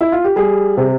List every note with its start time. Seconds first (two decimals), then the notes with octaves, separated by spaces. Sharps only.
0.01 E4
0.12 F4
0.24 G4
0.36 G3 G#4
0.77 C3